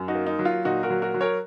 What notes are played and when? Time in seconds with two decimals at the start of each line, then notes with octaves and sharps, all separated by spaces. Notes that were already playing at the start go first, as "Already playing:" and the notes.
Already playing: F#2
0.08 D#4 F#4
0.15 A#3
0.27 D#4
0.39 F#3
0.45 F4
0.65 A#2 D#4 F#4
0.83 F#4 A#4
0.90 F#3
1.02 F#4 A#4
1.14 F#3
1.21 A#4 C#5